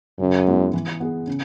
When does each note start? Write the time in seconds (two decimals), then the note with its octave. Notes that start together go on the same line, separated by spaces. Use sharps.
0.19 F#2 C#3
0.47 G#3 B3 E4
0.74 E3
1.00 B3 G#4
1.27 C#3